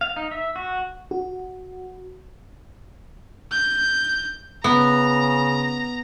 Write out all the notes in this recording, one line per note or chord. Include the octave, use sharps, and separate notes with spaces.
F5
D#4
E5
F#4
F#4
G6
C#3 B3 A#5